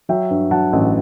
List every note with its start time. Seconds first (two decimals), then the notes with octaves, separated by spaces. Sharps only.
0.09 F#3 E5 G5
0.30 G2
0.51 F#3 F#5 A5
0.73 A1